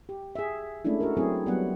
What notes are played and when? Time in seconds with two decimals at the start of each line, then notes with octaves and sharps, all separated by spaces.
0.09 G4
0.35 G#4 E5
0.85 G#3 A3 C#4 D4 E4
1.00 F#4 A4 A#4
1.17 F#3 C4 E4 G#4
1.46 F#3 G3 B3 F#5